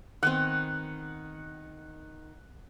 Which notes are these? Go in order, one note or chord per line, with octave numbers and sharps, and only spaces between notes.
D#3 B3 C4 F#5